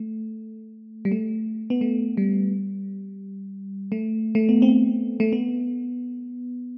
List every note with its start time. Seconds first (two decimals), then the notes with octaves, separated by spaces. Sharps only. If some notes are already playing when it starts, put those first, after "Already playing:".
Already playing: A3
1.05 G3
1.12 A3
1.70 B3
1.81 A3
2.17 G3
3.92 A3
4.35 A3
4.49 B3
4.62 C4
5.20 A3
5.33 B3